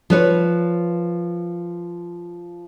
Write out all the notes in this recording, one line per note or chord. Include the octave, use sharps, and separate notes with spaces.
F3 B4 C#5